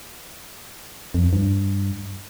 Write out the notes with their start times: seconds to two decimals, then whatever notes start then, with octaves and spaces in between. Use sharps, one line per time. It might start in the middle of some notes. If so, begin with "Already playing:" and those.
1.14 F2
1.33 G2